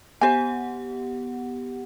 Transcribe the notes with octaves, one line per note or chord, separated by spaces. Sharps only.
B3 G4 C5 F#5 G#5